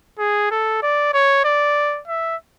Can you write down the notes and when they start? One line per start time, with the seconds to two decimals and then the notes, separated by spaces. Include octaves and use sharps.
0.18 G#4
0.51 A4
0.82 D5
1.13 C#5
1.44 D5
2.08 E5